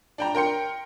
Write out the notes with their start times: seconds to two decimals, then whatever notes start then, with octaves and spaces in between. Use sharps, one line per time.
0.18 D4 G5 A#5
0.35 A#4 G5 C6 C#7